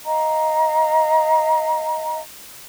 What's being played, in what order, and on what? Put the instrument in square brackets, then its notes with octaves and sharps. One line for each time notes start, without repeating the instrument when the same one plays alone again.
[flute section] D#5 F5 A#5